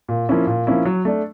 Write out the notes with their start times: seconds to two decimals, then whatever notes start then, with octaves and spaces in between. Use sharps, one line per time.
0.08 A#2
0.29 F3 A#3 C#4 E4
0.47 A#2
0.67 F3 A#3 C#4 E4
0.85 F#3
1.05 A3 D4